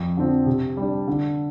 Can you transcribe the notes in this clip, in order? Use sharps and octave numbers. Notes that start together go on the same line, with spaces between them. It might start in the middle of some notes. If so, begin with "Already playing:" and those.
Already playing: F2
D3 F3 C4
C3
G3 D4
D3